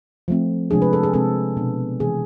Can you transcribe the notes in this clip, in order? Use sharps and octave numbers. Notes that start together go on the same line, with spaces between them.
F3 A3 C4
C3 F3 G#3 D4 G#4
B4
A4
G#4
C3 G#3 C4 A4
B2 B3 D4
C3 E3 G#3 G#4